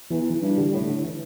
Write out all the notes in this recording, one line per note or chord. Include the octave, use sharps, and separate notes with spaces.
E2 E3
E3
G2
D3 G3
A2
D3
E3